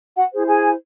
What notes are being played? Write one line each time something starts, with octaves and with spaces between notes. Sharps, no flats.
F#4 F#5
E4 G#4 C5
G#4 G#5